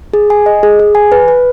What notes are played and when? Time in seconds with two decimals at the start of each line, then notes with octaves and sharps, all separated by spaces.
0.13 G#4
0.30 G#5
0.46 D#5
0.63 G#4
0.79 G#4
0.95 G#5
1.12 B4
1.28 B4